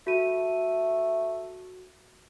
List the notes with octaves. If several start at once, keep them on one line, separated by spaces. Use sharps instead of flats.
A3 F#4 D#7